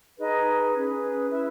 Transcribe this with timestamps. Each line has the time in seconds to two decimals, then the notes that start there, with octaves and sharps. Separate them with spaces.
0.18 D#4 G#4 B4 D#5
0.74 C#4 G#4 B4
1.30 E4 B4 E5